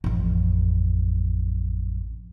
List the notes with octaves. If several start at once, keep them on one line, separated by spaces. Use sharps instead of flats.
A1 F2